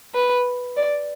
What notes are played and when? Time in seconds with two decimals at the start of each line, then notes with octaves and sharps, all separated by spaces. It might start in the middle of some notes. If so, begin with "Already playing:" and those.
0.14 B4
0.77 D5